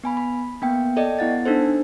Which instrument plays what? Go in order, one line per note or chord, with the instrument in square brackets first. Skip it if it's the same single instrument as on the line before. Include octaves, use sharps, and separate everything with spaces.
[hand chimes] B3 G#5 B5
B5
A#3 B3 G5
A4 D5 D#5 G5
B3 E4 F#5 A6
D4 D#4 A4 C5